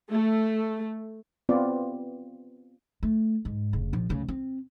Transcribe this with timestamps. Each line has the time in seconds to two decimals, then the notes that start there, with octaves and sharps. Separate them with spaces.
0.10 A3
1.49 B3 C4 F4 B4 D5
3.03 A3
3.45 G#2
3.73 F1 C#3
3.93 A#1 F3
4.09 D2 C#3
4.28 C4